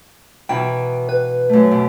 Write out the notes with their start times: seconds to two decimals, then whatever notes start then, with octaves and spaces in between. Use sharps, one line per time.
0.49 B2 D#3 E3 G5
1.09 B4
1.49 F#2 A3
1.71 B2